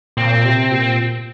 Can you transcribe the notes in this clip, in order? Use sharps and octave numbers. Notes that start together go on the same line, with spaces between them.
A#2 C4
C3
A#2